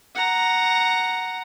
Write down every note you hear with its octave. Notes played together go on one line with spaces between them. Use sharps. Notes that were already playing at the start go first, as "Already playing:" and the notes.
F#5 A#5